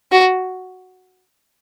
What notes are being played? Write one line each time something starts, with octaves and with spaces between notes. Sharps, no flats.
F#4